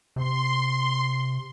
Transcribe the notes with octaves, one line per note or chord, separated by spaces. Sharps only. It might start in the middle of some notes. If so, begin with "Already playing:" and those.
C3 C6